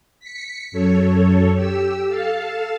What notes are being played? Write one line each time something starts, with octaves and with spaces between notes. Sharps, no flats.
B6 C#7
F#2 A4 C#5
G4 E6
A4 F5 A5